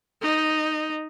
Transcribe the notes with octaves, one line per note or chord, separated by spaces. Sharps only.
D#4